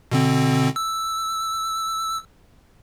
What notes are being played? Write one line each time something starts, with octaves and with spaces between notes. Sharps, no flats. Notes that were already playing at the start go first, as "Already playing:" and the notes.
B2 D3 C4
E6